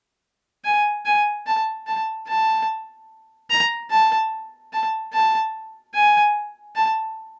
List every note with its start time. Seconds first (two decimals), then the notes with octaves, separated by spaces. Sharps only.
0.65 G#5
1.05 G#5
1.47 A5
1.87 A5
2.28 A5
3.50 A#5
3.90 A5
4.73 A5
5.13 A5
5.94 G#5
6.76 A5